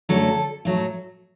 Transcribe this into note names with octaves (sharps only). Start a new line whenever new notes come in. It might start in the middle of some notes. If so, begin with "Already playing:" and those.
F#2 D3 F#3 A3 A4
A2 F#3 A3